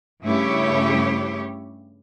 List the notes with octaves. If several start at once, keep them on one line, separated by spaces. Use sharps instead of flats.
G2 C#3 A3 E4 G4 C#5